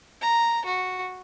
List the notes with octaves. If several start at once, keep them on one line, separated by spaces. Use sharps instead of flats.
A#5
F#4